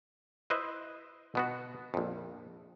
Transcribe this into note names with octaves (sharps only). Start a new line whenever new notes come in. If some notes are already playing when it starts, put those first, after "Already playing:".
E4 B4 C5 D#5 E5
B2 B3 F#4
A#1 F2